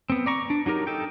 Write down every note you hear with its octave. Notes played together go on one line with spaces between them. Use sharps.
B3 C4
D5 A#5 C#6
D4
F#3 D#4 G4 A#4
D#4 A4 G5